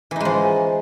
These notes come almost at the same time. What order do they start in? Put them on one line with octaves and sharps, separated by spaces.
E3 D#4 G#3 F3